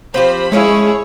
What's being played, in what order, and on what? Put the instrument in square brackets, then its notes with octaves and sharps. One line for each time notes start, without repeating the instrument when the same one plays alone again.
[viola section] F3 C5 B5 [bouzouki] C4 F4 G4
[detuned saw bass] G#3 [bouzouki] A3 C#4 F5 [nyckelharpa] E4 G#4 [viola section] C#5